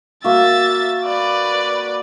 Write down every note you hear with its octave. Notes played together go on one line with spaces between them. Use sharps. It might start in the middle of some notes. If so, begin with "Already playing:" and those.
A#3 F#4 E5 A6
B4 D5